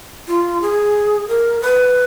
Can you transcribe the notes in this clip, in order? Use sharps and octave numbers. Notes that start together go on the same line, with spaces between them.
F4
G#4
A#4
B4